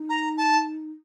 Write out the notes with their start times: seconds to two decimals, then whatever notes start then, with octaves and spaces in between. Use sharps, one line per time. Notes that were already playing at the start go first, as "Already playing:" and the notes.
Already playing: D#4
0.09 A#5
0.37 A5